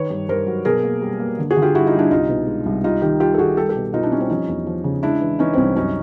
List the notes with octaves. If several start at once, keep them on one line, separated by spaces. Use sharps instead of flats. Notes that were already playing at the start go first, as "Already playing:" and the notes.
Already playing: D#3 B4 C#5
G2
G2 A#4 C5
F#3
B2 G#4 A#4
A#3
G3
A#3
D3
F#4 G#4
D3
F4 G4
G3 E4 F#4
D#4 F4
G3
D4 E4
C2 D#4 F4
B2
G#3
C2
G3 D#4 F4
D#3 F4 G4
G3 F4 G4
A4
D#3 F#4 G#4
G3 G4 A4
G4 A4
B2
B2 D#4 F4
D4 E4
G3 C#4
C4 D4
F3 C#4 D#4
E2
F3
C#3
G#3 D4 E4
E3
E3 C#4 D#4
C4
C2 C#4
F#2 C#4 D#4